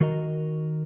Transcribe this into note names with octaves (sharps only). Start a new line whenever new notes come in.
D#3 F#4 A#4 D#5 A#5